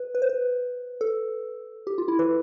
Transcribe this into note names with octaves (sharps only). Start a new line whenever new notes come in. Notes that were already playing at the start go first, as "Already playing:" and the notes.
Already playing: B4
B4
C5
B4
A4
G4
F4
E4
B4